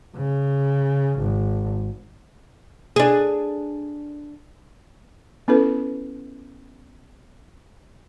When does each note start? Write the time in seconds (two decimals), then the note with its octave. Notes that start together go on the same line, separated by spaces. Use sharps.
0.16 C#3
1.19 G#1
2.96 D4 G#4
5.48 B3 C#4 E4 A4 B4